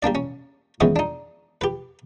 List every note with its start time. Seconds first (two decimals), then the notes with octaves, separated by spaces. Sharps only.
0.03 G3 A#3 D4 D5
0.15 C#4
0.81 D#3 E3 G#3 B3 C#4
0.96 D4 D#4
1.61 G4 B4